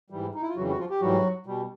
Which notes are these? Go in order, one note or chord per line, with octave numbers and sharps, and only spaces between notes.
G#2 E3 G3
D#4
E4
F4
F2 C#3 E3 F#3 G3 F#4
F#4
F3 F4
G4
G#2 E3 F#3 G3 F#4
B2 G3